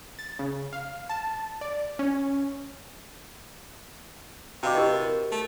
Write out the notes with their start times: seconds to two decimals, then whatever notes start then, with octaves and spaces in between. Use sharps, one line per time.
0.19 A6
0.39 C#3
0.73 F5
1.09 A5
1.61 D5
1.99 C#4
4.63 C3 F#4 D#5 F5 G5 B5 D6
4.75 E4 G4 B4 C5 D#5 E6
4.93 A#4 A6
5.32 A3